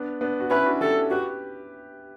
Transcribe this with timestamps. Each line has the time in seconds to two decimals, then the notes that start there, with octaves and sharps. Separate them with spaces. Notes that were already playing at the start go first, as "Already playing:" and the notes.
Already playing: B3 D4
0.21 B3 D4
0.40 F#4
0.50 C#4 E4 B4
0.66 D4 F#4
0.81 E4 G4 A4
1.11 F#4 G4 B4